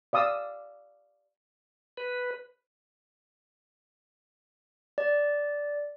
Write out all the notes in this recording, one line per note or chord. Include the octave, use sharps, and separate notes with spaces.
D5 F5 D#6 E6
B4
D5